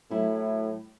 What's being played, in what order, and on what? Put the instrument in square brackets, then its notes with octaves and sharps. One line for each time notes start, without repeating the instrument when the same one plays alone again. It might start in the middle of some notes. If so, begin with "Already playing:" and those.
[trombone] A2 [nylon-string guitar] F#3 A3 E4